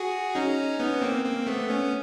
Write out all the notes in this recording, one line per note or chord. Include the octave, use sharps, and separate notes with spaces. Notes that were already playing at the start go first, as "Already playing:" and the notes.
Already playing: F#4 G#4
C#4 D#4
B3 C#4
A#3 C4
A#3 C4
A3 B3
B3 C#4